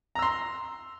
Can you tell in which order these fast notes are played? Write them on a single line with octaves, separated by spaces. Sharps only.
A#5 E6 C6